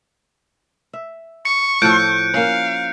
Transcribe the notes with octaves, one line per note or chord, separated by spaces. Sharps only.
E5
C#6 C#7
A2 F3 A4 F#6 G6 D7
A#3 C#4 F5